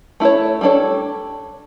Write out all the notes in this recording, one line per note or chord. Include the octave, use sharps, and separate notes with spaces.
A3 E4 A4 C#5
G3 D4 F#4 A4 C#5